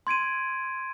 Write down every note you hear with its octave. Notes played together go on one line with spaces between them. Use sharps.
C6 G#6 D7 D#7